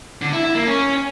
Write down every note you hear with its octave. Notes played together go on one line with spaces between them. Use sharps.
D3
E4
E4
A#3
C#4